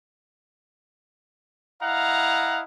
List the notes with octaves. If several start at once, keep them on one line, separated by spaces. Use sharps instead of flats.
E4 D#5 F5 F#5 A#5